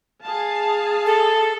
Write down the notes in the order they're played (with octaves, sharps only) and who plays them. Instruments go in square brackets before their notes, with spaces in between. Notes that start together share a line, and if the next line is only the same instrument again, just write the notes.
[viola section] G#4 F5 A5
[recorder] A4